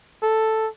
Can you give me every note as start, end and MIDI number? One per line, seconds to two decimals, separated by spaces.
0.23 0.68 69